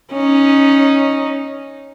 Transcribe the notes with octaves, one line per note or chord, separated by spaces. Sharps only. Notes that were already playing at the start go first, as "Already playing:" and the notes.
C#4 D#4